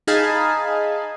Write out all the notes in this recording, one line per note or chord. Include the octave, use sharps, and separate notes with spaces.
D#4 G#4 F5 G#5 A5 B5